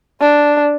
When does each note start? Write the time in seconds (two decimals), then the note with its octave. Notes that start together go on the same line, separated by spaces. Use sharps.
0.21 D4